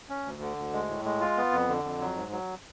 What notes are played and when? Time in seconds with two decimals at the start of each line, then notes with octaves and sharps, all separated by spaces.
0.10 C#4
0.25 D2
0.41 D3
0.57 D2
0.73 G#3
0.89 A2
1.05 G#3
1.21 F4
1.37 B3
1.52 F2
1.69 D3
1.84 F2
2.01 F#3
2.15 G#2
2.32 F#3